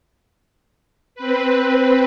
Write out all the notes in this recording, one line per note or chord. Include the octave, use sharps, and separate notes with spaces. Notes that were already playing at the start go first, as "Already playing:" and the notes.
C4 B4